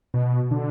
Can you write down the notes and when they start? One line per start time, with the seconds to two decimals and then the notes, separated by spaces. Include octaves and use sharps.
0.14 B2
0.51 D3